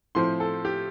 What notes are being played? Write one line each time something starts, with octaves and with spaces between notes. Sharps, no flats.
A2 F3 C4 C6
A4
G4